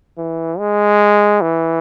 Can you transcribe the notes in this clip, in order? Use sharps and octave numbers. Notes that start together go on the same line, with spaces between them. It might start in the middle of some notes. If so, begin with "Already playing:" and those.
E3
G#3
E3